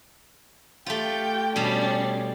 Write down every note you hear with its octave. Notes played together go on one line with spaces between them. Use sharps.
A3 F4 G4 G5
B2 G3 C#4 D4